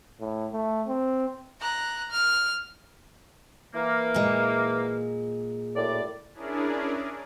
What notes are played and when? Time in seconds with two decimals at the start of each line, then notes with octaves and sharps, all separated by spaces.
0.20 A2
0.52 A3
0.87 C4
1.61 A#5 F#6
2.11 F6
3.75 E3 A#3
4.14 A#2 G#3
5.75 F#2 A2 D5
6.33 C#4 D4 E4 G#4 A#4 D5